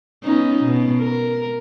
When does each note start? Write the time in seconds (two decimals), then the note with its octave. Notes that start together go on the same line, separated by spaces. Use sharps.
0.24 B3 C#4 D#4
0.63 B2
0.99 A#4